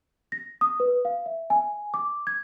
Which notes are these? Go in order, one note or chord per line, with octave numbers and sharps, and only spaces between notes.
A#6
D#6
B4
F5
E5
G#5
D6
G#6